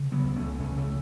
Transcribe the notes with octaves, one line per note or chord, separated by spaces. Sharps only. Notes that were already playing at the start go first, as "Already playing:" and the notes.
Already playing: C#3
F#3 B3
C#2
A3 C#4
C#3 A3 C#4
A3 C#4